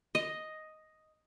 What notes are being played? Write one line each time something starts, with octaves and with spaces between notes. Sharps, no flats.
D#5